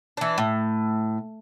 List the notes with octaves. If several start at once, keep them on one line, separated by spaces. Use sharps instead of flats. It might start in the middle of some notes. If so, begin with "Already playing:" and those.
E3 D4
A2